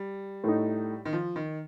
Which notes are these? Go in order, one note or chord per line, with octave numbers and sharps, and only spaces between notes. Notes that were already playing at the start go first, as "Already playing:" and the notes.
Already playing: G3
A2 A3 D#4
D#3
F3
D#3